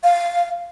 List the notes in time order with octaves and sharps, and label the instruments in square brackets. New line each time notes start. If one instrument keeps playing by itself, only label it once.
[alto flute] F5